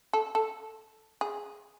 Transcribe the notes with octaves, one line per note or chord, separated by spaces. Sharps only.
A4
A4
G#4